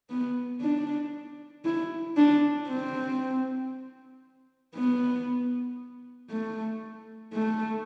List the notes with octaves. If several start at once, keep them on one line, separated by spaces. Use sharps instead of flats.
B3
D4
E4
D4
C4
B3
A3
A3